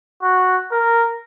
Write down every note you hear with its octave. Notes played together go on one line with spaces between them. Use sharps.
F#4
A#4